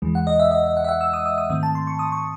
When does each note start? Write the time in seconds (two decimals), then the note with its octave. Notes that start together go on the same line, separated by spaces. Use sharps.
0.02 E2 C#3 E3 G#3
0.15 F#5
0.27 D#5
0.40 E5
0.51 D#5
0.64 D#5
0.77 F#5
0.84 E5
0.89 F#5
1.01 E6
1.13 D#6
1.26 D#6
1.38 D#6
1.50 G#2 D#3 A3 C4 D#6
1.63 A5
1.75 C6
1.87 C#6
1.99 D#6
2.12 C#6